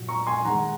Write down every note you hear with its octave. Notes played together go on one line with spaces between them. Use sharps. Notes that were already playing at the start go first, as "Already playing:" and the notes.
Already playing: A#2 F#3
A#5 C#6
G#5 C6
D#3 G#3 F#5 A#5